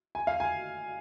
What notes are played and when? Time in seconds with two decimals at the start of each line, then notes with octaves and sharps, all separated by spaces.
0.15 G#5
0.27 F5
0.40 G#5